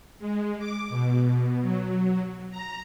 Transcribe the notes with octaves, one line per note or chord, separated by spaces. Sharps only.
G#3
D6
B2
F#3
A#5